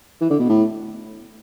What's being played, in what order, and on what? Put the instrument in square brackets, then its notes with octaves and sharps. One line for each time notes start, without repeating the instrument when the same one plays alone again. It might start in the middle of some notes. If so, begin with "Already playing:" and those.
[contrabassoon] E3
D3
B2
A2